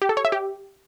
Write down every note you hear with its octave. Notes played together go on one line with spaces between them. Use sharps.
G4
A4
C#5
E5
G4